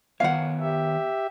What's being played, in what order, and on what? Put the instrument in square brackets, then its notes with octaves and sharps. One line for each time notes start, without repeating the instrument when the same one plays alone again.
[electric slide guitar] D#3 B3 C#5 [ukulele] F5 F#5
[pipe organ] G4 E5